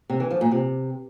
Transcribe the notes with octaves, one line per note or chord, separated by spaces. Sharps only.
C3
E3
F3
A#2
C3